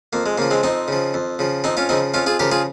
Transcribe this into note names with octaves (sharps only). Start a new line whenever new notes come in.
F2 A#3
G#3
C#3 F3 A#3
G#3 C4
F2 C4 D#4
C#3 F3
F2
C#3 F3
F2 C4 D#4
C#4 F4
C#3 F3 C4 D#4
F2 C#4 F4
F4 G#4
C#3 F3 G4 A#4
F4 G#4